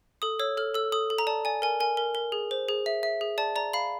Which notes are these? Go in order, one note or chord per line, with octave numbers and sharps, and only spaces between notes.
A4 D#6
C#5 E6
A4 F6
A4 E6
A4 D#6
A4
A#5
D5 A5
D5 G#5
A#4 G#5
A#4 G#5
A#4
A#4
G#4
C5
G#4
E5
E5
G#4
D5 A5
D5 A#5
F5 B5